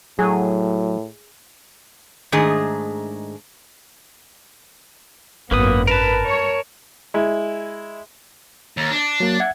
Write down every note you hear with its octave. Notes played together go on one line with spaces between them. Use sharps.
A2 F#3 G#4
G#2 D#3 A3 D4 G#4 D#5
G#1 F#2 A#3 B3 B4 D#6
A#4 B4 A5
C#5
G#3 E4
D#2
D4
F#3 A#3
E5 F#5 G#6